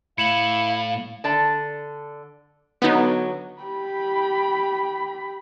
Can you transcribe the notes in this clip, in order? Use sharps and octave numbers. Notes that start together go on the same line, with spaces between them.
A2 E4 F5 C#7 E7 F#7
D3 D5 A5
D3 F#3 B3 D#4
G4 B5